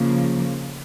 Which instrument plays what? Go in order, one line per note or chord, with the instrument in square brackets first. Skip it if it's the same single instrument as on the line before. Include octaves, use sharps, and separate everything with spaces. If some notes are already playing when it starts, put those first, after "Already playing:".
Already playing: [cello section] C#3 F3 A#3